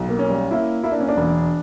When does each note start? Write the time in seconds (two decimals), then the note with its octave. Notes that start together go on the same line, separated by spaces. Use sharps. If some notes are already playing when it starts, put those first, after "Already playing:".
Already playing: B1
0.09 A#3
0.19 C#4
0.30 G3
0.51 A#3 E4
0.84 A#3 E4
0.92 D4
1.00 C#4
1.08 D4
1.17 E1